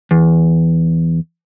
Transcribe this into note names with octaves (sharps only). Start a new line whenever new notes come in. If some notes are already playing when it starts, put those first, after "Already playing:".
E2